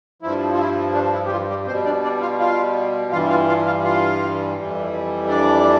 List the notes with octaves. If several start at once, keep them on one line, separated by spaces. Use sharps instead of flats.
G2 F3 E4
F4
E4
D4
E4
G4
F3 F4
G3 G4
B2 G3 C4 C5
D4 D5
D4 D5
F4 F5
F4 F5
G2 E3 G3 F4 F5
F4 F5
F4 F5
F4 F5
F4 F5
F2 E3 G3
D4 D5